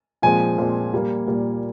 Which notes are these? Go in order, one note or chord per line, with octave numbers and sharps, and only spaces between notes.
A#2 F3 G#3 C4 G#5
A#2 F3 G#3 C4
A#2 G3 A#3
A#2 G3 A#3